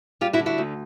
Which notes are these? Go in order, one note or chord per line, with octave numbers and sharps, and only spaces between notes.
G3 F4 G4
E4 F#4
D3
E4 F#4
D2